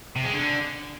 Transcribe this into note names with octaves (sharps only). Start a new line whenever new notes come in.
C3
G#3
D3